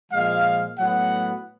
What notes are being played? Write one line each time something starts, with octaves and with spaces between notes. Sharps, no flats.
A#2 F3 G#3 F5
A2 F#3 B3 F#5